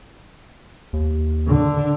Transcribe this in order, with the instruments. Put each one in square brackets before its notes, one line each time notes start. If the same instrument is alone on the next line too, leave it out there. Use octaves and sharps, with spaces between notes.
[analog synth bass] D#2
[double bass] D3